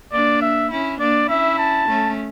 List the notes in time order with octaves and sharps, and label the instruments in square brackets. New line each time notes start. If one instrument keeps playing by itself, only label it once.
[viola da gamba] A#3 D4 [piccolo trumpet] D5
[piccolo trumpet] E5
[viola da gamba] C#4 E4
[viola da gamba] A#3 D4 [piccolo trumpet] D5
[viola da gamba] C#4 E4 [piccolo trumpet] E5
[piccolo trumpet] A5
[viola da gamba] A3 C#4